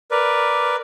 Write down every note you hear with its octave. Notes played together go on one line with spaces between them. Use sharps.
A#4 B4 D5